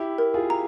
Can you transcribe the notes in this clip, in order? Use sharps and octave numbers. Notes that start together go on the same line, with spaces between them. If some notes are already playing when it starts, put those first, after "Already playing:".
Already playing: E4 G4
A#4
F4 G#4
A#5